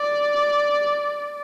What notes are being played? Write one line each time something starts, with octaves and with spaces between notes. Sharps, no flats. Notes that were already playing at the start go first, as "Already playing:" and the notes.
Already playing: D5